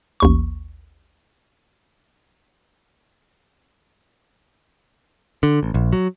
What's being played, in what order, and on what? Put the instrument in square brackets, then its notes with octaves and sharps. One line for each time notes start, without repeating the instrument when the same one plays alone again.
[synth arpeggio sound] A1 D#2 C#6
[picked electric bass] D3
A1
A#1
F#3